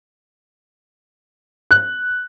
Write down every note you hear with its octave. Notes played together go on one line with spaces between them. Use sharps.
F#6